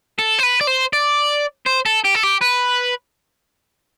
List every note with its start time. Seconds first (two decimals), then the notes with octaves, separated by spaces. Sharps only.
0.19 A4
0.39 C5
0.43 B4
0.61 D5
0.67 C5
0.93 D5
1.66 C5
1.86 A4
2.04 G4
2.15 A4
2.23 G4
2.41 B4